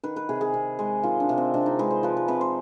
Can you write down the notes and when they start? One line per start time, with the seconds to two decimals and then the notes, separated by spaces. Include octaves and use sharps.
0.04 D#3 B4
0.16 B4
0.29 C3 G#4
0.41 G#4
0.54 C3
0.79 G#3
1.03 D#3 F4
1.20 D4
1.29 C3
1.38 C4
1.54 C3 D4
1.66 D#4
1.79 G#3 B4
1.91 C5
2.03 F3 B4
2.17 B4
2.28 C3 B4
2.41 C5